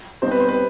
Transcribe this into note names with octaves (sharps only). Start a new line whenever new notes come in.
B2 G3 C4 D#4 C5
B4
C5
B4